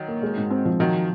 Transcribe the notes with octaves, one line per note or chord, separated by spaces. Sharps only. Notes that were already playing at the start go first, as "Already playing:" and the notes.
Already playing: D#3 F#3
A#3
G#3
G#2
C4
F3
D#3 F3 F#3